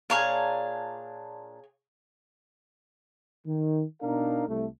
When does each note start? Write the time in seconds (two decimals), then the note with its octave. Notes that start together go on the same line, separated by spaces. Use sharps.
0.10 A#2 D4 G#4 C#5 F5 A#5
3.45 D#3
4.02 B2 D4 D#4 A#4 F5
4.47 C2 A3